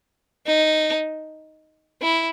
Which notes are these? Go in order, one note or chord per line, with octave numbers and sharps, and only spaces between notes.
D#4
E4